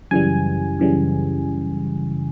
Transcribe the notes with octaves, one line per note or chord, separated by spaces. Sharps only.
F#2 C#3 E3 G3 G#5
F#2 C#3 E3 G3